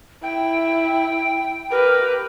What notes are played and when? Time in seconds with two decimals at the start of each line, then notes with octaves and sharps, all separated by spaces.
0.23 E4 G5
1.71 G4 A#4 B4